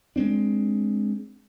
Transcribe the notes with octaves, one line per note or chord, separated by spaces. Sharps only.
G#3 A#3 C4 D4